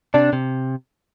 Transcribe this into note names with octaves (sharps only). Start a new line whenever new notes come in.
C3 D4
C3